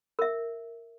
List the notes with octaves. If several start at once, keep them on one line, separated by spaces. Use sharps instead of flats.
A#4 E5